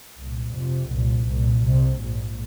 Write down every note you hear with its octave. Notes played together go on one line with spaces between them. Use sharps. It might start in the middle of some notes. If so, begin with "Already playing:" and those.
C2 A#2
F1 F2 C3
C2 A#2
C2 A#2
C2 C3
A#1 G#2